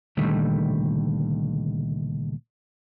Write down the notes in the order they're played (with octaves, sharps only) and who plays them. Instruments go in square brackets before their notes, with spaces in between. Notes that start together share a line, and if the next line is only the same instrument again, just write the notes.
[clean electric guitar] C#2 A#2 D3 D#3 G3 A3